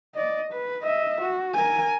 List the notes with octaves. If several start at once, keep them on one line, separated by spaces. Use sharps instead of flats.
D5 D#5
B4
D#5 E5
F#4
A#4 G#5